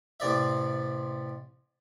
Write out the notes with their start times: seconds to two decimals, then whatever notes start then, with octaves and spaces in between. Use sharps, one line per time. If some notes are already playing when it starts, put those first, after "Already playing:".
0.20 A1 C3 D5 E5